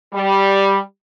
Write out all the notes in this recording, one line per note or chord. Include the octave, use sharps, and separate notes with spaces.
G3